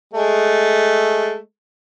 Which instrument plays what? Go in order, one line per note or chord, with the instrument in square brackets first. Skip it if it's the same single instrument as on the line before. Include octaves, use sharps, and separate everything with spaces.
[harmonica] G#3 A3